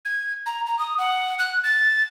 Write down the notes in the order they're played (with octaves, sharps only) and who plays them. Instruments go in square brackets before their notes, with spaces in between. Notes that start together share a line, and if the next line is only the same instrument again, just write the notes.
[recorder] G#6
A#5
A#5
D#6
F#5
F#6
A6